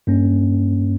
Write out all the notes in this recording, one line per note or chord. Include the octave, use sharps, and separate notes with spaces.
G2 A#3 C#4